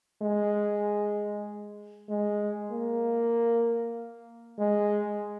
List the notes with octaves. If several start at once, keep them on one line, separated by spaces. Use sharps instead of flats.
G#3
G#3
A#3
G#3